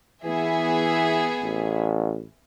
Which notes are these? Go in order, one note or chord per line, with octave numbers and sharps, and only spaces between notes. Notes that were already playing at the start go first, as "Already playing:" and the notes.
E3 B3 G#4 E5
A1